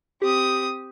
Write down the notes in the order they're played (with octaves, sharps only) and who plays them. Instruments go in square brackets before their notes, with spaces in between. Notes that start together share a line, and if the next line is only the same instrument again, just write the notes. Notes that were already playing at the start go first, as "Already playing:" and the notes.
[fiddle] C4 D#6 [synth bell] G4